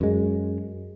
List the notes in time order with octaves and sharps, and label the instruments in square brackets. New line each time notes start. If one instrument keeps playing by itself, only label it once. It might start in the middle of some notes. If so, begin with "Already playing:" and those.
[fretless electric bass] F#2 G#3